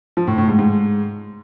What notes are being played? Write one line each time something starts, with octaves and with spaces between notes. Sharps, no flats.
F3
A2
A2
G#2
G#2